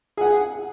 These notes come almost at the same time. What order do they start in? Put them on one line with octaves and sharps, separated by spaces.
G#4 F#5 G#5